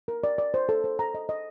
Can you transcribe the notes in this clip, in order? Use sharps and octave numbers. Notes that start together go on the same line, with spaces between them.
A#4
D5
D5
C5
A4
C5
A#5
D#5
D#5